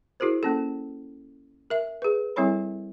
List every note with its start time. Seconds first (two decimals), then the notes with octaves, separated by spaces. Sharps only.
0.20 E4 F#4 G#4 A#4 C5
0.43 A#3 C#4 A4
1.70 A#4 E5
2.02 G#4 B4
2.36 G3 C4 E4 A4 C#5 B5